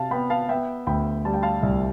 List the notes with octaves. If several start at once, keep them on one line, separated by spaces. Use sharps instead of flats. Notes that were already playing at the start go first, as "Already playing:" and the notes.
Already playing: C3 F5 A5
B3 G5 B5
F5 A5
B3 E5 G5
D2 G5 B5
G3 A5
G5
F5 A5
C2